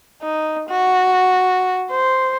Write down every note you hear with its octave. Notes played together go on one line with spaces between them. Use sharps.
D#4
F#4
C5